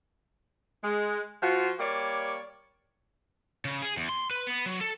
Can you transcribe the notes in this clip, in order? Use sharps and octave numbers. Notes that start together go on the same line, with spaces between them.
G#3
F3 F4 F#4
G3 A#3 C#5 D5
C#3
G#4
E2
C6
B4
B3
F#3
A4